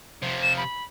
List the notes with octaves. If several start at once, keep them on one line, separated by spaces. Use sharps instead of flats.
C3 F3
E7
B5